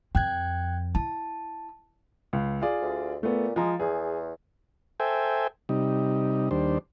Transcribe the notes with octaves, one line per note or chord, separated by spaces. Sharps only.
F2 G5 F#6 G#6
E4 A5
C#2
F4 G#4 D5
D2
A#2 A3 B3
F3 G#3 A#5
E2 G#4
A4 C5 E5 G5 G#5
C3 G3 D#4
D#2 G3 D4 C5